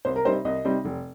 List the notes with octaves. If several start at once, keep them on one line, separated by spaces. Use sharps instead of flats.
C2 C5
A#4
C3 G3 C4 D#4 C5
C2 D#5
C3 G3 C4 D#4
F1